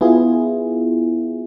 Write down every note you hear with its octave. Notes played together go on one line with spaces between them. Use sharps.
B3 E4 F4 G#4